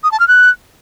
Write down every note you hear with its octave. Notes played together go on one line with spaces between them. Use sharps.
D#6
A5
F6
F#6